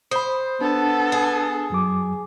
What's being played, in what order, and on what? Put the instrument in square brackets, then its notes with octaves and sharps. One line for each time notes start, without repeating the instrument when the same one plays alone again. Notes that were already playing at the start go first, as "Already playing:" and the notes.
[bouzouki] C5 [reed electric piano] B5 D#6
[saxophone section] B3 [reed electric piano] D4 [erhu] A4
[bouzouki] G#4
[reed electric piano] F#2 F#3 D6